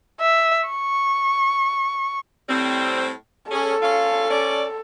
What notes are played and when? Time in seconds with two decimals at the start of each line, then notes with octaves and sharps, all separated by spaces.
0.20 E5
0.68 C#6
2.49 A2 G3 C4
3.51 C#4 G#4 A4
3.82 C#4 F4 F5
4.30 C#4 D5